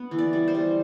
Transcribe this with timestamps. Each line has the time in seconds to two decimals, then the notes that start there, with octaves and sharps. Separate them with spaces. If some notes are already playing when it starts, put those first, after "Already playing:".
Already playing: B3
0.11 E3
0.18 D5
0.33 G3
0.48 C5
0.55 G3